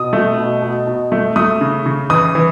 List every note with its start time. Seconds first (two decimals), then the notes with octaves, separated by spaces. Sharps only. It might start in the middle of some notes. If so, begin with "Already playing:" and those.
Already playing: B2 D#6
0.13 A3
0.37 B2
0.62 B2
0.87 B2
1.12 A3
1.36 A3 D#6
1.61 C#3
1.86 C#3
2.10 E3 D#6
2.35 E3